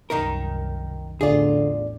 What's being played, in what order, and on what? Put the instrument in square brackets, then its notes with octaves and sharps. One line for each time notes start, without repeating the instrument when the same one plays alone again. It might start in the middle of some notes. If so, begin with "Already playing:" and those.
[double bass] C2 F#2 [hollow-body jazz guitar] D#3 D#4 A#4
[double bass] A1 E2 [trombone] D3 [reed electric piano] D4 D5 [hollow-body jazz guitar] F4 G#4